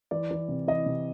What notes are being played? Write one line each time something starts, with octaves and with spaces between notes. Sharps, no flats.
E3 D5
E3
C3
E3 D#5
C3